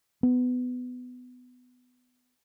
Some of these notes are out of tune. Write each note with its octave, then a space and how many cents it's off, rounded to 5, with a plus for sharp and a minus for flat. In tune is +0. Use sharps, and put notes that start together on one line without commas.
B3 +20